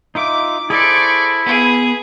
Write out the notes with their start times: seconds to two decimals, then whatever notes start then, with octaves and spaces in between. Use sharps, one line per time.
0.15 D#4 F4 E5 D6
0.70 E4 G#4 A4 C5 D5 C#6
1.46 B3 G#4